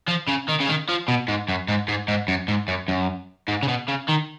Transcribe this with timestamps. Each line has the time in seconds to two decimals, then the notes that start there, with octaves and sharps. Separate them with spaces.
0.08 F3
0.29 C#3
0.49 D#3
0.60 C#3
0.68 D#3
0.89 F3
1.08 B2
1.28 G#2
1.49 F#2
1.68 G#2
1.88 G#2
2.08 G#2
2.28 F#2
2.48 G#2
2.68 F#2
2.88 F#2
3.48 G#2
3.63 C#3
3.68 B2
3.88 C#3
4.08 D#3